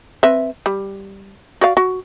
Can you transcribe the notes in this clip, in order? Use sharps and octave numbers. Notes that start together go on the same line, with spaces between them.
C4 B4 E5
G3
F#4 D5 F5
F#4